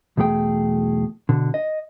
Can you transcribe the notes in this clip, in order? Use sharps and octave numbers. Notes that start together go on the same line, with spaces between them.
B1 E2 A3 G#4 G5
B2 D3
D#5